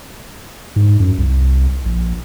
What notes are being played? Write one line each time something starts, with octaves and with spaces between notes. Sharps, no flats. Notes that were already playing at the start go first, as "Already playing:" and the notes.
G#2
F#2
C2
A#1